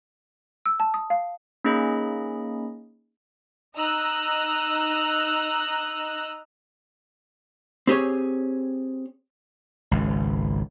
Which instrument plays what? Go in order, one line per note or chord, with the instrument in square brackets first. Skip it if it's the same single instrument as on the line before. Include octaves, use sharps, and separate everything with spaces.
[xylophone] E6
A5
D#6
F5
[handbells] A#3 C#4 D#4 G#4 D#5 B5
[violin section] D#4 D#5 A#5 E6 F#6
[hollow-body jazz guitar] C4 G4 G#4 C#5
[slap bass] G#1 C#2